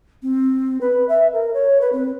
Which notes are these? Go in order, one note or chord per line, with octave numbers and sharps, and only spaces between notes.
C4
B4
E5
A#4
C#5
B4
C4